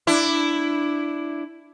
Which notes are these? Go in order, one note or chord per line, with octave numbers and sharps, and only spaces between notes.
D4 E4